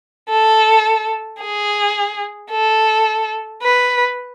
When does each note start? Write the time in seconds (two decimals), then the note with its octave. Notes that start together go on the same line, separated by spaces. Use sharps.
0.29 A4
1.41 G#4
2.51 A4
3.62 B4